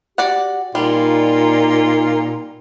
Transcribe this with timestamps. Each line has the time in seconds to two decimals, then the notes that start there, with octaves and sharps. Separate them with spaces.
0.18 F#4 G4 D5 F#5
0.75 A#2 G3 D#4 F4